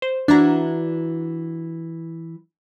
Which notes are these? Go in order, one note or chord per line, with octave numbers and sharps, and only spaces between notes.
C5
E3 D4 E4 F#4 A#5